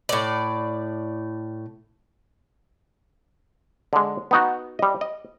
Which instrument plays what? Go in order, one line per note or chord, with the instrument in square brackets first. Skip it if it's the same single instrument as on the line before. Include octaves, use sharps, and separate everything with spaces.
[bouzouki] A2 D5
[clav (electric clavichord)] D3 G#3
B3 D#4 F#4
G3 D#5
D#5